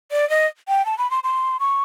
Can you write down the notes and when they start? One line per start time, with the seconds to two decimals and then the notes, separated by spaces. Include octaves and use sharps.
0.11 D5
0.30 D#5
0.68 G5
0.86 A5
0.98 B5
1.11 C6
1.24 C6
1.60 C#6